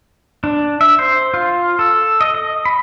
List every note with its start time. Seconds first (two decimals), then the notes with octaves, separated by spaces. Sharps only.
0.44 D4
0.81 E5
0.99 C5
1.34 F4
1.79 A4
2.21 D#5
2.35 D#5
2.65 B5